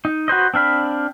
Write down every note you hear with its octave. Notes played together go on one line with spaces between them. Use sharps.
D#4
F#4 B4 C5 D#5
C4 D4 F5 B5